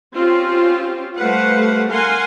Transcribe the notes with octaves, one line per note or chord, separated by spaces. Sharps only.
C4 C#4 F4 G4
G3 A3 B4 C5 F5 F#5
A#4 F5 F#5 G#5 C6